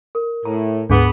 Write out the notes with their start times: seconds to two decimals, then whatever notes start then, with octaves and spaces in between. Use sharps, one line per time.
0.15 A#4
0.45 A2 A#5
0.90 D2 G#2 B3 D4 G#4